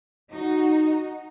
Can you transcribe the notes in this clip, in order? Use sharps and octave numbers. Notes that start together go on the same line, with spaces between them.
D#4 F#4